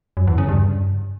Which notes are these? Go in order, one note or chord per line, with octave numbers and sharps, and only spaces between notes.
F#2
E2
C#3
G2